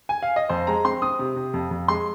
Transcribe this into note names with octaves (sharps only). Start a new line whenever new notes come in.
G#5
F5
D#5
F2 C5
G#3 A#5
C4 C6
C4 D#6
C3
C3
F2
F2
G#3 C6